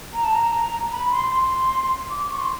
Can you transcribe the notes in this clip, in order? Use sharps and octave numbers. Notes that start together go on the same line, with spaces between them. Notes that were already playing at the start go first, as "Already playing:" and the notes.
A#5
A5
A#5
B5
C6
C6
D6
C#6
C6